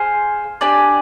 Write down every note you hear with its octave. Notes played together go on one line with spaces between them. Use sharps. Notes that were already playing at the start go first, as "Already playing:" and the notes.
Already playing: G#4 C5 F5 G#5
D4 G4 D5 G#5